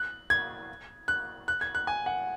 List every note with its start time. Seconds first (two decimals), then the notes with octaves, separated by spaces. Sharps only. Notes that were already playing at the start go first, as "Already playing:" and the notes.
Already playing: F#6
0.30 G#6
1.08 F#6
1.48 F#6
1.61 G#6
1.75 F#6
1.87 G#5
2.06 F#5